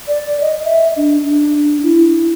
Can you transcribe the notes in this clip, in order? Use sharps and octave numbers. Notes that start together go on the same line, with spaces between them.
D5
D#5
E5
D4
D4
E4